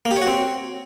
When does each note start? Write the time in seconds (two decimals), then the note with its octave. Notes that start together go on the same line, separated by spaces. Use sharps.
0.05 A#3
0.11 G4
0.16 C#5
0.22 F#4
0.27 C4